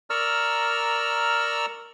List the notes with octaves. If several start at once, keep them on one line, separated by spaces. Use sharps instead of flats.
A#4 D5 A#5 C#6 E6 F6